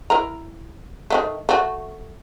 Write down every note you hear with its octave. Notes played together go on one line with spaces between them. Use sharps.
E4 A#4 A#5
D#3 F#3 A3
A3 F#4